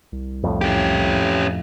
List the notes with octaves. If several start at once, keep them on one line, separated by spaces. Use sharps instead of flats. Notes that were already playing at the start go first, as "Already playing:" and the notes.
C2
F2 A2
C#4 G4